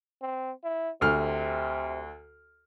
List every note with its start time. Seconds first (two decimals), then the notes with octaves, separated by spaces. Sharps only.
0.22 C4
0.64 E4
1.01 D2 C3 F6